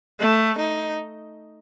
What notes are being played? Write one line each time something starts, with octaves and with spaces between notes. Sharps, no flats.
A3
D#4